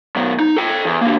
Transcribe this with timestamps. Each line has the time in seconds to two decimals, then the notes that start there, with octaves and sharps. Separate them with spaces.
0.16 F#2 B2
0.40 D#4
0.57 A4 G5
0.85 E2
1.01 D3 A#3